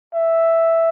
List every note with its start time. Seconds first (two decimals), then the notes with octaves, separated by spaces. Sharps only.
0.14 E5